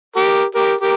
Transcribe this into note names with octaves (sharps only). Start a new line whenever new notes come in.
G4 A#4
G4 A#4
G4 A#4